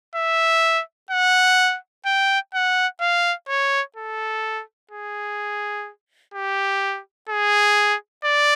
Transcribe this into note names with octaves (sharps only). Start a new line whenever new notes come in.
E5
F#5
G5
F#5
F5
C#5
A4
G#4
G4
G#4
D5